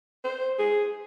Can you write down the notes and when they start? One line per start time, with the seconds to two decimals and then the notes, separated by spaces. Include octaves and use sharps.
0.24 C5
0.59 G#4